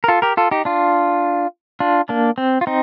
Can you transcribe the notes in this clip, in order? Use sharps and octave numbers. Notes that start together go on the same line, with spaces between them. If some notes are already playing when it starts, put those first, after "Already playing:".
A#4
F4 A4
G4 A#4
F4 A4
D#4 G4
D4 F4
D4 F4
A#3 D4
C4
F4
C4 D#4